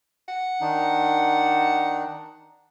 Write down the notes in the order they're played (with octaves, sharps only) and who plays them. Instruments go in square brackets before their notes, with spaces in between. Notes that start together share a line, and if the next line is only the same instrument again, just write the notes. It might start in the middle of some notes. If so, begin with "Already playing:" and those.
[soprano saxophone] F#5
[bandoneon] D#3 D4 D#4